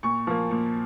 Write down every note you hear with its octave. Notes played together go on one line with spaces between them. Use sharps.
A#2 C#6
F3 A#3
A#2